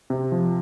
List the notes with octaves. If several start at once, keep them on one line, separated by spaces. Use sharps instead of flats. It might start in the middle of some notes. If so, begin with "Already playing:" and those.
C3
F3